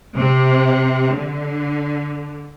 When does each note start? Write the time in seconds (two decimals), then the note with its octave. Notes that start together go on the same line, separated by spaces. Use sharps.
0.15 C3
1.15 D3